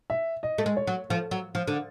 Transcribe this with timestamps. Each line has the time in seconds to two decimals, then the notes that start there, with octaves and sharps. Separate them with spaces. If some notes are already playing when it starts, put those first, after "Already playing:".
0.10 E5
0.43 D#5
0.58 A3
0.66 G#3
0.77 C#5
0.87 F#3
1.10 F3 A4
1.31 F#3
1.55 F3
1.67 D3